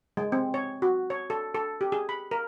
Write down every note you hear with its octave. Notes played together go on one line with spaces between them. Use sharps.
G#3
C4
C#5
F#4
C#5
A4
A4
G4
G#4
B5
A#4